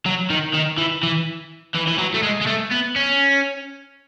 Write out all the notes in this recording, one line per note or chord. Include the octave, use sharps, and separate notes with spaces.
F#3
D#3
D#3
E3
E3
E3
E3
F#3
A3
G#3
G#3
A3
B3
C#4